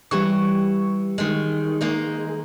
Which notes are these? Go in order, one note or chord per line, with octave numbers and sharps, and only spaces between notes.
E3 G3 E4 G4 C#6
D#3 G#3
G#3 A#3 D#4